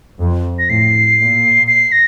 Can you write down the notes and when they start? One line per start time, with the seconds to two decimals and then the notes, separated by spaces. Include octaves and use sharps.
0.20 F2
0.59 A#6
0.69 A2 C7
1.18 A#2
1.67 C7
1.92 A#6